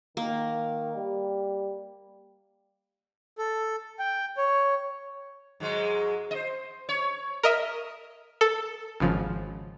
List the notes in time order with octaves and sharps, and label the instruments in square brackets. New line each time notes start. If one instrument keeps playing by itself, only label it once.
[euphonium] D#3 [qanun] A#3
[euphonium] G3
[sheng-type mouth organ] A4
G5
C#5
[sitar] G#2 F#3 G#3
C5 D#5
C#5
[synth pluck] A#4 D#5 E5
A4
G#1 C#3 F3